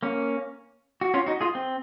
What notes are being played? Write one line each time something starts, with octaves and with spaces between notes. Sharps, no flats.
A#3 C#4
F#4
C#4 F4
D#4 F#4
F4 G#4
C4